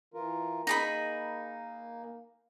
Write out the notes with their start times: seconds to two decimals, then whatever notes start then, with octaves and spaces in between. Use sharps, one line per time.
0.14 E3 F4 A#4
0.67 A#3 D#4 G#4 B5